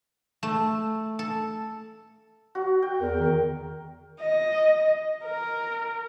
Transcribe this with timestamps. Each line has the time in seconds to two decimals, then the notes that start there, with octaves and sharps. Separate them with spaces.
0.43 A3
1.19 A4
2.55 F#4
2.82 G5
2.99 E2 A#4
3.19 D#3
4.20 D#5
5.24 A#4